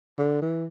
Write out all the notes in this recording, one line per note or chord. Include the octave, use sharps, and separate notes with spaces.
D3
E3